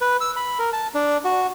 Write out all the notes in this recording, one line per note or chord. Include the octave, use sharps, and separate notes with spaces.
B4
E6
B5
A#4
A5
D4
F#4